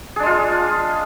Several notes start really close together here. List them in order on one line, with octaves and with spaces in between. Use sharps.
G#4 D4 G#3 F4